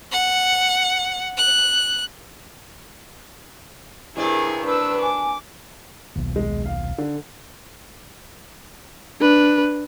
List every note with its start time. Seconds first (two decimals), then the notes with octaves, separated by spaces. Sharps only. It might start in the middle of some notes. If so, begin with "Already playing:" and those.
0.12 F#5
1.37 F#6
4.17 G2 C3 E4 G#4 A#4 D5
4.65 D4 B4 E6
5.02 G#5 D6
6.15 D#1 B1
6.36 G#3
6.66 F5
6.98 D3
9.21 D4 B4